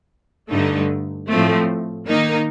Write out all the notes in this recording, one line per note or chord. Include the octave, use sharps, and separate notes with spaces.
G2 D3 A3 D#4
A2 F3 A3 C4
D#3 A#3 D#4